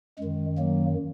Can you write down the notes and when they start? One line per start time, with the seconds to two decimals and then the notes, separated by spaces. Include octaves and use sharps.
0.18 F#2 D#3 G#3
0.58 F#3 A#3